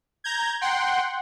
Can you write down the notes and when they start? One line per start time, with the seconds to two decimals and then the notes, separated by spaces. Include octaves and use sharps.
0.24 A#5 G6 G#6
0.61 F#5 G5 C6